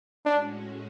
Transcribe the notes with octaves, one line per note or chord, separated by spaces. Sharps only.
A2 G#3 C#4 D4 F#4